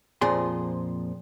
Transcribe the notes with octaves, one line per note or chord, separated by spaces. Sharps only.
F2 A#2 F3 G#4 C6